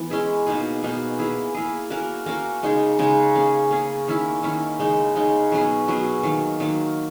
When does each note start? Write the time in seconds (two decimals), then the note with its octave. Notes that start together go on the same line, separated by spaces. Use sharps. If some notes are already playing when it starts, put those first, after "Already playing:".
Already playing: E3 B3
0.10 G#3 C#4 E4 G#4
0.47 B2 A#3 D#4 G#4
0.83 B2 A#3 D#4 G#4
1.19 A#3 E4 G#4
1.54 A#3 E4 G#4
1.90 A#3 C#4 F#4 A#4
2.26 A#3 C#4 F#4 A#4
2.63 C#3 G#3 D#4 G#4
2.99 C#3 G#3 D#4 G#4
3.35 A#3 C#4 G#4
3.71 A#3 C#4 G#4
4.08 D#3 A#3 C#4 E4
4.43 D#3 A#3 C#4 E4
4.79 C#3 G#3 D#4
5.16 C#3 G#3 D#4
5.52 B2 F#3 C#4 G#4
5.88 B2 F#3 C#4 G#4
6.23 D#3 F#3 A#3
6.60 D#3 F#3 A#3